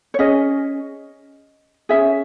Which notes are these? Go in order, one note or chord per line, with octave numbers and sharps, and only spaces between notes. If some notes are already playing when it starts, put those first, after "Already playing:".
C#5
C#4 G#4 D#5
C#4 E4 G#4 E5